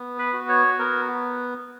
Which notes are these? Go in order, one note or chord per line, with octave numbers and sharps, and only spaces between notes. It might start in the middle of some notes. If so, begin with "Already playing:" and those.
Already playing: B3
B4
F#4
C#5
B3 A#4